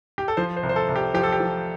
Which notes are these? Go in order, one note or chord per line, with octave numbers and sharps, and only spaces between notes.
G4
A4
F3 C5
C5
C2
C5
A4
C2
G4
F3 G4
A4
G4
F3